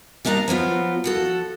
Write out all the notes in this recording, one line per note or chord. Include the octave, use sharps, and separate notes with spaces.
G3 A#3 D4 D#4 A#5
F3 F#3 B3 F4
F3 F#4 A4